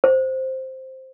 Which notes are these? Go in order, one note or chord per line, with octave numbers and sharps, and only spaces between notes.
C5